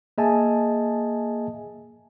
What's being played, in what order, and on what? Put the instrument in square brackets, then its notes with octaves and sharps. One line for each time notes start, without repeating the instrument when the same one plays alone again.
[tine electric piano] A#3 G#4 D#5 E5 G#5 A5